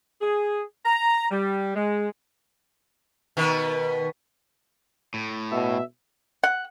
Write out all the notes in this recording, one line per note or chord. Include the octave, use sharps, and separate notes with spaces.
G#4
A#5
G3
G#3
B2 D#3 B3
A2
B2 E5
F#5